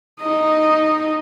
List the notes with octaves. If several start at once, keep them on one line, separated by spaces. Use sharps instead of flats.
D#4 D#5